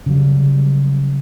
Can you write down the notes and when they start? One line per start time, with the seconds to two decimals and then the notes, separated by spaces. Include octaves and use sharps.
0.06 C#3 F#3 G3